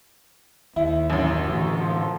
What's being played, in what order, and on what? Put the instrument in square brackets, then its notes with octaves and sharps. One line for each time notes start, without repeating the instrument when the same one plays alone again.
[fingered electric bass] D#2 [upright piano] E4
[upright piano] A1 F#2 [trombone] F#4
[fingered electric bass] A2 D3 E3
[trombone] F3